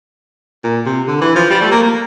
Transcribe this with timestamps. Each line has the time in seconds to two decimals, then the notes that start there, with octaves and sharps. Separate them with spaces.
0.64 A#2
0.86 C3
1.08 D3
1.21 E3
1.36 F3
1.51 G3
1.62 A3
1.71 A#3
1.83 A#3